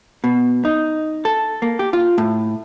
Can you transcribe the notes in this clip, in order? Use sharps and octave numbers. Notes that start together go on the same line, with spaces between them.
B2
D#4
A4
A#3
G4
F4
A2